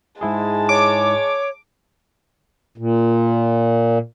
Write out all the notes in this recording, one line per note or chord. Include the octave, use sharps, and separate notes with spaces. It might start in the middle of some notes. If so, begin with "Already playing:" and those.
G#2 G#3 E4 G#4 A5
C#5 D6
A#2